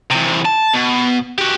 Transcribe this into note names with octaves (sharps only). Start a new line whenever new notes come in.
E2 C3
A5
B2
F#4 G4